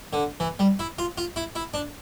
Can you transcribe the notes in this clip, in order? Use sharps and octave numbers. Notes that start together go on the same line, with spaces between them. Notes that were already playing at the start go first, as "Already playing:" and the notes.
D3
E3
G3
E4
F4
F4
E4
E4
D4